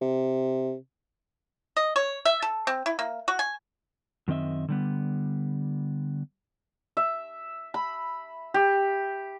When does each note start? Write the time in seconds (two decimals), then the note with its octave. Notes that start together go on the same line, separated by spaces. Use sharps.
0.01 C3
1.77 D#5
1.96 C#5
2.25 E5
2.42 A4
2.67 C4
2.86 E4
2.99 A#3
3.28 F#4
3.39 G#5
4.28 F#2 D#3 C4 D#5 E5
4.68 D3 G3 B3
6.97 E5
7.74 B5
8.54 G4